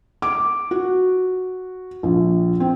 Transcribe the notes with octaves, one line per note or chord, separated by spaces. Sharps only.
D6
F#4
A#1
C4